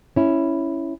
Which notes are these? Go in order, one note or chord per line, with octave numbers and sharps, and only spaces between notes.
C#4 E4